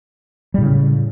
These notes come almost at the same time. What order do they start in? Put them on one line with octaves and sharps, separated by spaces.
G3 A2 C#3